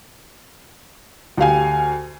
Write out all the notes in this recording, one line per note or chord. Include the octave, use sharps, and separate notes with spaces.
D2 G4 F5 G#5